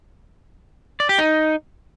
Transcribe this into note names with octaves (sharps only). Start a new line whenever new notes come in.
D5
G4
D#4